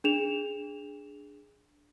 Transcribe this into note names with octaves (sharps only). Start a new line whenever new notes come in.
D4 G#4 E7 F7